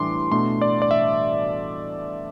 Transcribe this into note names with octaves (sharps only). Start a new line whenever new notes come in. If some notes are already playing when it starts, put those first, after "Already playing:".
Already playing: A2 E3 G3 D4 C6 D6
B2 A3 D4 C6
D5
D5
E5